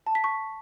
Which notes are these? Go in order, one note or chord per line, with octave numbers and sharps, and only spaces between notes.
A5
B6
C#6